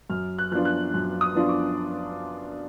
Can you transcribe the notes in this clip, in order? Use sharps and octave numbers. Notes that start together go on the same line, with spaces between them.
F#2 F6
F#6
F3 B3 D4 F4 F#6
F#6
F#2
D#6
F3 B3 D4 F4
D6